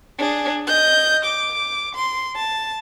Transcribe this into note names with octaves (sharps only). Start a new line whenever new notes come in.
D4 G#4
D#5 G6
D6
C6
A5